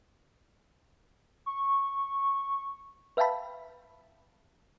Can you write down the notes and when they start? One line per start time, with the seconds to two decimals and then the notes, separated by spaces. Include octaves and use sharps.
1.46 C#6
3.17 B4 E5 F5 G5 A5 B5